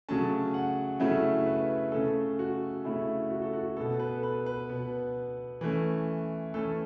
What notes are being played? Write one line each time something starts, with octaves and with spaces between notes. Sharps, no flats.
C#3 F#3 A3 C#4 A5
F#5
C#3 F#3 A3 C#4 E4
B4
C#3 A3 C#4 A4
F#4
C#3 A3 C#4 E4
F#4
A4
F#4
B2 B3 A4
B4
A4
B4
B4
B2 B3
E3 A3 C#4
E3 A3 C#4 A4